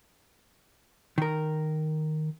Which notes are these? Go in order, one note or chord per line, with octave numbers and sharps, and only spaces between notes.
D#3 A#4